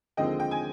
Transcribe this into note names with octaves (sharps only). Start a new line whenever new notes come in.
D#2 D3 F3 G#3 C4 D#5 G5
G5
G#5